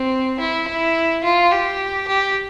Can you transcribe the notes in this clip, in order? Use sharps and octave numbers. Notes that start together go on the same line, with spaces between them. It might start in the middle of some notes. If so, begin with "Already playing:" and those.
Already playing: C4
E4
E4
F4
G4
G4